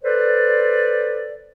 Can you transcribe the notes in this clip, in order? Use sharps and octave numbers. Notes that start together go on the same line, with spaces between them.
A4 B4 C5 D5